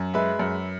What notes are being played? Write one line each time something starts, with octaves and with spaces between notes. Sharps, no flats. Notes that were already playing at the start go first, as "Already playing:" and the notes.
Already playing: F#2
G#3 B4 E5
F#2